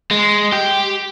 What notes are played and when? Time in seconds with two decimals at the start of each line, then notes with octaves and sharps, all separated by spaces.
0.11 G#3
0.53 G4